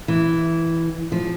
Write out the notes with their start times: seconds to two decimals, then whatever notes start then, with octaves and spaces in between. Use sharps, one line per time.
0.08 E3
1.12 F3